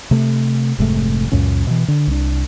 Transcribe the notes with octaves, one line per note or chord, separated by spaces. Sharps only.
C3 A3
F1 G#2 C3 A3
C#2 F#2 A#2 C#4
B2 E3
D3
C2 D4